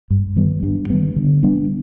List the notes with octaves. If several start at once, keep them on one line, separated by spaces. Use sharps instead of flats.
G2
D#3 G3 B3
G2
D#3 G3 B3
D3
G3 B3 D4